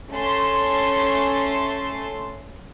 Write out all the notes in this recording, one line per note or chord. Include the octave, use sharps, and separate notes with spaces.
A3 C#4 A5 C6